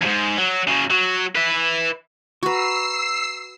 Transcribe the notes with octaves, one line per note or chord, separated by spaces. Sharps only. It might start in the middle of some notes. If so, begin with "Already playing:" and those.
E2 G#2
F#3
C#3 F#3
F#3
B4 E5
F#4 B4 A#5 C#6 E6 C7